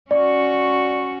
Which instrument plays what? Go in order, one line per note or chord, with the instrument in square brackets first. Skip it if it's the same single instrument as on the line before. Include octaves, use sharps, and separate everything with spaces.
[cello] C#4 F#4 [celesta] D5